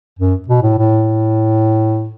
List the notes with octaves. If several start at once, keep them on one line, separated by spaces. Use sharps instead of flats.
F#2
B2
A2
A2